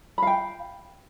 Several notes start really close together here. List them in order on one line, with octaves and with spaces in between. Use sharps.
B5 F5 G5